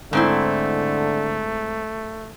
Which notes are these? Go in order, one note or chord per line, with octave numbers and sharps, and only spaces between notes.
G#2 D3 A3 C4 E4